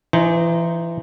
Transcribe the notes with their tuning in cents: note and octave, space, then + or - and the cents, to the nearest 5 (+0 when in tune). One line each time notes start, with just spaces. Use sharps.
E3 +30 D#4 +0 C5 +0